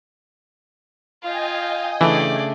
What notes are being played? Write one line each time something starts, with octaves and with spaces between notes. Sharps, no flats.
F4 D#5 F5 G5 G#5
C#3 E3 A3 D4 D5